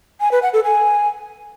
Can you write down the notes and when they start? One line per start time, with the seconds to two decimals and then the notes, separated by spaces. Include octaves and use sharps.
0.21 G#5
0.31 B4
0.42 F#5
0.53 A4
0.64 G#5